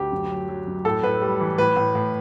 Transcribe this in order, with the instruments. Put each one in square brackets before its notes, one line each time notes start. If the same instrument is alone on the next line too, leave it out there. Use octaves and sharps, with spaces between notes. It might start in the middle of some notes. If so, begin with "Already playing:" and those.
Already playing: [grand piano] D2 G4
F#2
F#3
F#3
F#2
A2 A4
A2 B4
G3
E3
A2 B4
A2
A2